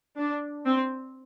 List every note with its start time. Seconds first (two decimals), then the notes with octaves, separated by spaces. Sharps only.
0.19 D4
0.65 C4